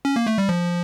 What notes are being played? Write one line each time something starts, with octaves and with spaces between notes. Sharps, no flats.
C#4
A#3
A3
G3
F3